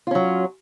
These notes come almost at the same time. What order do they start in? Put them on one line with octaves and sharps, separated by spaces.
F4 C#4 F#3